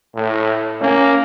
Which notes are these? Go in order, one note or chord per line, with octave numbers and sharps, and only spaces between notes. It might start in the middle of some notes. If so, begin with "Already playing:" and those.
A2
A#3 C#4 G#5